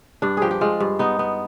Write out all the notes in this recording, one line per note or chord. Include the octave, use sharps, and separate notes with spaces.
G2 D4
F3 G4 G#4
G4
G#3 F4
G2
B3 D#4
B3